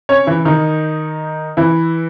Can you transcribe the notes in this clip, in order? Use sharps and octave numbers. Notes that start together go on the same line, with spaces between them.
C#4 C#5
E3 E4
D#3 D#4
E3 E4